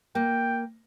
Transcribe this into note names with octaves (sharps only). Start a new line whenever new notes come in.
A#3 G5